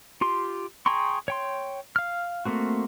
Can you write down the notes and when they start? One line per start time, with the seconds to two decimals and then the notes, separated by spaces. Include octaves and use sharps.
0.21 F4 G4 C6
0.86 G#4 G5 A#5 C6 C#6
1.28 C#5 G5 C6
1.96 F5 F6
2.45 A3 A#3 C4 F#4